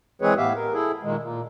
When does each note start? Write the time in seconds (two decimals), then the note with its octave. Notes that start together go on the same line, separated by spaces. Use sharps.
0.22 E3 G#3 C4 G#4 B4 C#5
0.37 A2 B3 G4 E5 F5
0.56 A#4
0.73 E4 G#4 A4
1.03 A#2 D#3 G#3
1.19 A#2